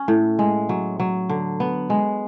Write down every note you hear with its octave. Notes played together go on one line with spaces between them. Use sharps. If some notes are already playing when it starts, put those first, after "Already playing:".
Already playing: C#4
A2
G#3
F#3
F#3
D3
B3
G#3